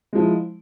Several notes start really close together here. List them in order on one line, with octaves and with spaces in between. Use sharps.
G#3 F3 E4